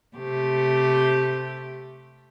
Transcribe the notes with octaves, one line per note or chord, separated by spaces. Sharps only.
C3 A3 G4